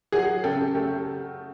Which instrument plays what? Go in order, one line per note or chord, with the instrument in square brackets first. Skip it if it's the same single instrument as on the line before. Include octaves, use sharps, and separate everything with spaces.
[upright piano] F#3 [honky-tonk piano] F#4 G#4
[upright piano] C#3 [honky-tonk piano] G4 A4
[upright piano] A3 [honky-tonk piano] G4 A4